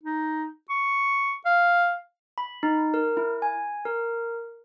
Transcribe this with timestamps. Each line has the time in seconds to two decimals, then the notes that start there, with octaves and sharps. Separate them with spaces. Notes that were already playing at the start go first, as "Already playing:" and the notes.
0.03 D#4
0.69 C#6
1.45 F5
2.38 B5
2.63 D#4
2.94 A#4
3.17 E4
3.42 G#5
3.85 A#4